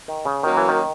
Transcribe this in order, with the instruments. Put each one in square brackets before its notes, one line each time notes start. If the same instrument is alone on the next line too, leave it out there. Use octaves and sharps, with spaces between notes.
[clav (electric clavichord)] D#3
C#3
[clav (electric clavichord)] D#3 [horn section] F#3 A#3 C#4 F#4 A#4
[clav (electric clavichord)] E3
D#3